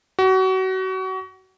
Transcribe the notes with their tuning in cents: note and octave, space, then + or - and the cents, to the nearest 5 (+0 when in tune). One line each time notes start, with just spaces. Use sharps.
F#4 +30